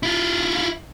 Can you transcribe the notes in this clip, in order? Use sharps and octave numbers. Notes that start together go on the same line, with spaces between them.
E4 F4